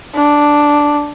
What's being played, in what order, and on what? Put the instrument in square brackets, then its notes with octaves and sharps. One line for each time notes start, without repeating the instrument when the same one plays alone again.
[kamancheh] D4